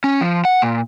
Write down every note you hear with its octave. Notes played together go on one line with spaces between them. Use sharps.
C#4
F3
F#5
A#2